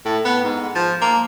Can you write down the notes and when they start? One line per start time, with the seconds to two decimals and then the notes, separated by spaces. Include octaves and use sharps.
0.05 A2
0.25 B3
0.44 G#2
0.75 F3
1.01 A#3